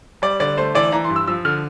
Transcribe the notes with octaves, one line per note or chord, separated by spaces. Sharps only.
G3 D5
D3 D5
A3 C5
E3 D5
E3 A#5
C6
G2
E6
F3 E6
D3 F6